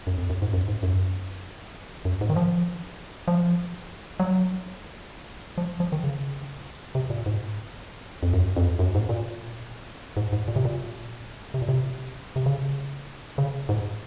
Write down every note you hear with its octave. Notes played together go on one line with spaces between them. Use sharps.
F#2
F2
F#2
G#2
F#2
G#2
F#2
F#2
G#2
D#3
F3
F3
F#3
F3
F3
D#3
C#3
C3
A#2
G#2
F2
F#2
F2
F#2
G#2
A#2
G#2
G#2
A#2
C3
A#2
C3
A#2
C3
C3
C#3
C#3
G#2